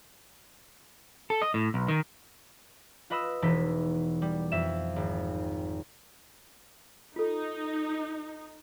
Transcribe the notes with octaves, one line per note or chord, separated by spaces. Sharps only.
A4
D#5
A2
B1
D#3
F4 B4 D#5 B5 D#6 E6
E1 E3 D#4 B6
G3
F2 E5 E7
G#1
D#4 F4 A4